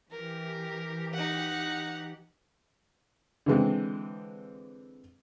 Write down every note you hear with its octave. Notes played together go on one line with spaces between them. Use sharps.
E3 G4 A#4
D#4 F#5
D3 E3 G#3 C4